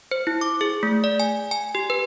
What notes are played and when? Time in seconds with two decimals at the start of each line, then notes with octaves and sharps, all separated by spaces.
0.11 C5
0.27 E4
0.41 D6
0.61 G#4
0.83 A3
1.04 D5
1.20 G#5
1.51 G#5
1.75 G4
1.90 B4